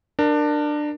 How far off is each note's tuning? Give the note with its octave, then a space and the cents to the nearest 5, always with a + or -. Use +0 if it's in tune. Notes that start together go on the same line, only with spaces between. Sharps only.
D4 +20 A#4 +0